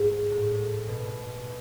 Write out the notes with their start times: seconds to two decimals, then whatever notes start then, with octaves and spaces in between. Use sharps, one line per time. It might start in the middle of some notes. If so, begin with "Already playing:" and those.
Already playing: G#2
0.31 A2
0.88 B2